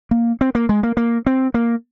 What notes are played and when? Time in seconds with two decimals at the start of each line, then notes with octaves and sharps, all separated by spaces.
0.11 A#3
0.41 C4
0.55 A#3
0.69 G#3
0.83 A#3
0.97 A#3
1.26 C4
1.54 A#3